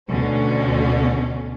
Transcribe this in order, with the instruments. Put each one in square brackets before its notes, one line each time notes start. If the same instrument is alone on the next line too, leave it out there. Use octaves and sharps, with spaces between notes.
[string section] D2 B2 D3 C#4